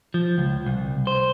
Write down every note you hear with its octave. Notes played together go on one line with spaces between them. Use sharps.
F3
C#2
C2
C5